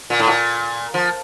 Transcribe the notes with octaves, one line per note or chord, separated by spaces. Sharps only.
A#2
A2
A#2
F3